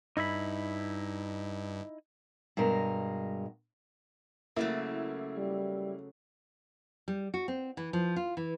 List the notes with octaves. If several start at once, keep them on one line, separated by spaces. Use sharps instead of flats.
G2 D#4 E4 B5
G2 B2 G#3 A#4
C#3 F#3 A3 A#3 E4
G3
G3
F#4
C4
E3
F3
F4
E3